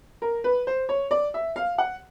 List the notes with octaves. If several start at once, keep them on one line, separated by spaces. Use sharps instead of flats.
A#4
B4
C5
C#5
D5
E5
F5
F#5